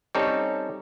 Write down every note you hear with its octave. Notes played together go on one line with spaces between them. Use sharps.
G3 C4 C#4 D#4 A4 C#5